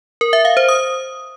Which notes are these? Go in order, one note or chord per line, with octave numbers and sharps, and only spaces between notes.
A#4
E5
F5
C5
D#6